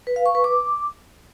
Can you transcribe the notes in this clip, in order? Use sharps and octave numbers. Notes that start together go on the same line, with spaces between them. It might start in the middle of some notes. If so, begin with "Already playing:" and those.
B4
F5
C#6
B4
D6